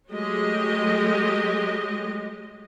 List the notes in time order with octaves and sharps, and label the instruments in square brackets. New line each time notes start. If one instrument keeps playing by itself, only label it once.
[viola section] F#3 G#3 A3 G4 D#5